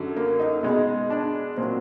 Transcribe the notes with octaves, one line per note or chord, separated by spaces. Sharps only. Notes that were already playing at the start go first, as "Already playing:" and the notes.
Already playing: F#2 D3 F#3
A#3
D#4
B2 G#3 D#4
D4
A#2 F#3 C4